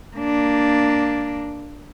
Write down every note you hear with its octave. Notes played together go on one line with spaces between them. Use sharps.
A#3 D4